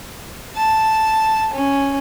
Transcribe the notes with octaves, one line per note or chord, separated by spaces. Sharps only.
A5
C#4